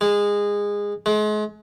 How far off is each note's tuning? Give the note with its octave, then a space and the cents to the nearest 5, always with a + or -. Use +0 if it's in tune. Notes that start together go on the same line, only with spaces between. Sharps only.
G#3 -20
G#3 +35